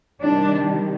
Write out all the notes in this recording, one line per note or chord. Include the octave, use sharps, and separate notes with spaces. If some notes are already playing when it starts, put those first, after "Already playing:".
C3 D#3 G3 D4